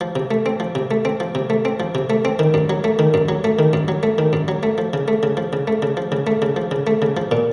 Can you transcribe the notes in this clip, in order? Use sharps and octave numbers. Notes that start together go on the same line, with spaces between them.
F3
C3
A3
C4
F3
C3
A3
C4
F3
C3
A3
C4
F3
C3
A3
C4
D#3
F#2
F#3
A3
D#3
F#2
F#3
A3
D#3
F#2
F#3
A3
D#3
F#2
F#3
A3
F3
C#3
A3
C#3
F3
C#3
A3
C#3
F3
C#3
A3
C#3
F3
C#3
A3
C#3
F3
A#2